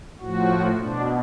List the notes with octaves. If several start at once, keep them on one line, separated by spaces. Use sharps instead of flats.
A2 F3 F#4
B2 D4